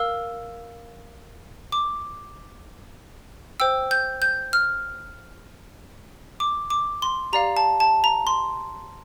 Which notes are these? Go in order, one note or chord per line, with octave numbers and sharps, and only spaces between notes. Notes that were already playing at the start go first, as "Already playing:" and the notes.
Already playing: A#4 F5 E6
D6
C5 G5 E6
G6
G6
F6
D6
D6
C6
G4 D5 F5 A#5
A5
A5
A#5
C6